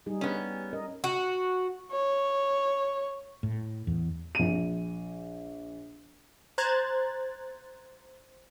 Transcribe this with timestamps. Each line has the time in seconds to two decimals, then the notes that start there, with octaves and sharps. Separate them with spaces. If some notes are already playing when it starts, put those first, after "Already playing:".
0.06 G3 D#4 G#4
0.21 B3 C#4
0.73 C#4 A#4 D#5
1.04 F#4
1.92 C#5
3.43 A2
3.87 E2
4.35 A#1 D#7
6.58 C5 A#5 F#6 G#6 A6